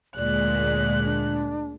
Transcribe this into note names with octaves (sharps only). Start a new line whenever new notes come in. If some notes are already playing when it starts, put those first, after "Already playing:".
D2 A#2 G#3 D5 F#6
D4